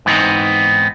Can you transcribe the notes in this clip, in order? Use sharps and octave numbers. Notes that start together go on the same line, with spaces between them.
G#2 E3 B3 C4 D#4